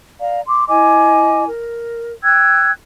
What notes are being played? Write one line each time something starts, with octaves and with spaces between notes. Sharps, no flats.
D5 F5 A#5
C6 D6
E4 D#5 G#5 D6
A#4
G5 E6 F#6 G#6